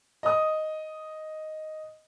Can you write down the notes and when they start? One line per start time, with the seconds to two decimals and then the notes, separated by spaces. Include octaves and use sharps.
0.23 D#5 D#6